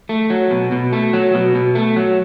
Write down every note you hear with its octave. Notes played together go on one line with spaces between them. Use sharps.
A3
F#3
B2
B2
A3
F#3
B2
B2
A3
F#3